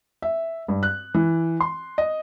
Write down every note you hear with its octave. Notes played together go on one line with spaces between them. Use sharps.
E5
G2
F#6
E3
C6
D#5